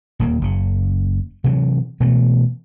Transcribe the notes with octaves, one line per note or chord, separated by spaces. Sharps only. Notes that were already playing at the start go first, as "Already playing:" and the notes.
D#1 D#2 F3 A#3
F#1 C#3
C3 E3 F#3
B2 E3 A3